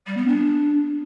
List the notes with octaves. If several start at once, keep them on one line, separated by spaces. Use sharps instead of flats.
G3
B3
D4